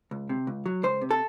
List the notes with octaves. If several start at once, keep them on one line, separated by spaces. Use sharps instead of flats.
C#2
C3
C#2
F#3
C#2 C5
C3
A4